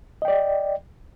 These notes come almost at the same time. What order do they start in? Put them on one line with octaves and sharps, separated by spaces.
D#5 G5 D5